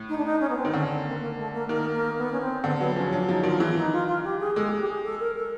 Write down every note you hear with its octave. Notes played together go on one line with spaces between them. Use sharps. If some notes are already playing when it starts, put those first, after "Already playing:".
Already playing: A2
D#4
D4
D#4
C#4
B3
C4
D#3
D3 C#4
C4
A#3
A#3
A3
A#3
D#3 A#3
A#3
B3
C#4
C4
D3 B3
F#3 B3
F3 C#4
F#3 D4
F3 D#4
D#3 F4
E3 E4
D#4
F4
F4
G4
G#4
G#3 A4
G4
G#4
G4
G#4
A4
A#4
A4